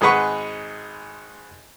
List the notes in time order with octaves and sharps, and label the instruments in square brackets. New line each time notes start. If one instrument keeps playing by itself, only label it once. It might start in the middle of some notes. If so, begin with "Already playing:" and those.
[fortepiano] G#1 G#3 G#4 B4 F#5 C#6